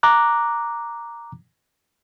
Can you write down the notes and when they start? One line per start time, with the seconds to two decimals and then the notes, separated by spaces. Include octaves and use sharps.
0.03 A#5 D6 F#6